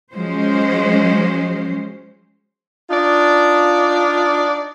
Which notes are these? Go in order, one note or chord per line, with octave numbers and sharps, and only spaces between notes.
F3 F#3 G#3 C#4 C5
D4 D#4 F4 D5